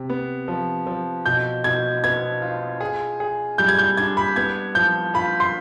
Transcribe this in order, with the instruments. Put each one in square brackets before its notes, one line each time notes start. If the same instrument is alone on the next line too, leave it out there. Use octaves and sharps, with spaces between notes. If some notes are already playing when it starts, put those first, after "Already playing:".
Already playing: [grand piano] C3
B3
F3
F3
[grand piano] B2 [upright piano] G6
[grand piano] B2 [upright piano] G#6
[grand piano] B3 [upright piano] G#6
[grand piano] F4
G#4
G#4
[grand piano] G3 [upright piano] G6
[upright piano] G#6
G6
[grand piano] D4 [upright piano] G#6
[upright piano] B5
[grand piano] B3 [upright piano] G#6
[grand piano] F3 [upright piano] G6
[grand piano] F4 [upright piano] B5
[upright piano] C6